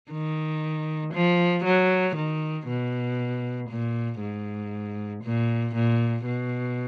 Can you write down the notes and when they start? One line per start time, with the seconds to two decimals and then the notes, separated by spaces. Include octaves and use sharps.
0.11 D#3
1.14 F3
1.64 F#3
2.16 D#3
2.68 B2
3.69 A#2
4.20 G#2
5.23 A#2
5.75 A#2
6.25 B2